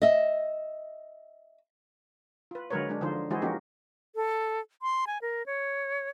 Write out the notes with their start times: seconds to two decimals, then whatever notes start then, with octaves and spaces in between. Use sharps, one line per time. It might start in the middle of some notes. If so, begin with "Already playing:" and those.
0.02 D#5 E5
2.51 F4 B4
2.70 D3 F#3 G#3 A#4 B4 C#5
2.89 G#3 D4
3.01 D3 F3 D#4 F4 C5
3.30 E3 G#3 E4 F#4 G#4 C5
3.42 F3 A#3 C#4 D#4 F#4 G4
4.15 A4
4.82 C6
5.07 G#5
5.22 A#4
5.46 C#5